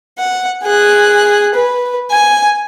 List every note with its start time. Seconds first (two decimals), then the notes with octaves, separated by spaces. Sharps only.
0.18 F#5
0.63 G#4 F#6
1.54 B4
2.11 G#5